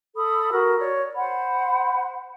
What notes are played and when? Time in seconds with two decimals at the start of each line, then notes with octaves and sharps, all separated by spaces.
0.16 A4 B5 D#6
0.52 F#4 A#4
0.79 C#5 D5
1.16 C5 F#5 B5